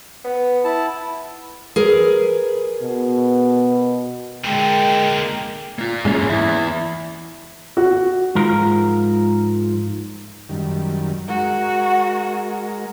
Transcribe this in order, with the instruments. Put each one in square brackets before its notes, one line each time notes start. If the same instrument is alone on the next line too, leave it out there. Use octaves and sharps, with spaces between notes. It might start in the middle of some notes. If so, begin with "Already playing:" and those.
[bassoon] B3
[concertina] E4 A5
[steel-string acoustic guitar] G#4 A#4 B4
[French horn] B2
[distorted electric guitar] A#2 D3 [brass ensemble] G#3 A#4 [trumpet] G5
[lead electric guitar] A#3 F4
[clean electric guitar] G#2 G#3 C#4 [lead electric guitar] E3 A#3
[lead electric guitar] E2 [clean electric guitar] E4
[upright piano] F#4
[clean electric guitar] G#2 F3 A#4
[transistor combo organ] F#2 D#3 G3
[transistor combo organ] G#3 A#4 [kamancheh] F#4